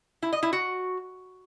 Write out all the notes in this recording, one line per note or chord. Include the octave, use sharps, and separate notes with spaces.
E4
D#5
E4
F#4